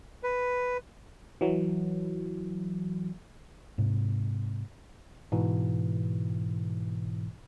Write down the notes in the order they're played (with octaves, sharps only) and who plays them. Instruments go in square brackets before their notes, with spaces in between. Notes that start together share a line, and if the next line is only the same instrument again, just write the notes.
[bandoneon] B4
[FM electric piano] E3 F#3
[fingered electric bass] G#2 C3
[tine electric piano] G#2 B2 E3